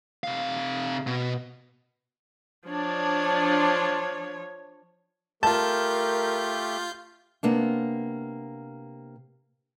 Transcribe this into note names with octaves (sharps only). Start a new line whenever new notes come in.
C3 F5
B2
F3 D4 C#5
A3 F4 G4 A#4 A5 G6
C3 A#3 B3 D4